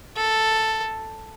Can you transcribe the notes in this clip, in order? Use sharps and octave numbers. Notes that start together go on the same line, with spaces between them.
A4